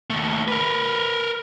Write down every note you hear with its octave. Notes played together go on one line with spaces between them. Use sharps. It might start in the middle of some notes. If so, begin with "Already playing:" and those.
D#2 A3
A#4 B4